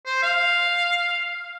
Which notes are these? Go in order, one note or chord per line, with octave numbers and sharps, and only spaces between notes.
C5
F5